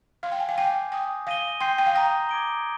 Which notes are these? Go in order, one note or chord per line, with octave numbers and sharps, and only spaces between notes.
F5 C6 F6 G#6
G5
G#5
F5
G5 G#5 D6 G6 C7
G5 G#5 D#6 A#6
F5 D#6 A#6 D#7 G7
G5 C6 G6 C7
G5
F5
G5 A#5 D#6 A#6
D6 G#6 D7 G7